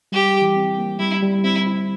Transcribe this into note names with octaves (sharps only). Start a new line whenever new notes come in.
G3 G4
E3
C4
A#3
G3 E4
G3
C4 E4
E4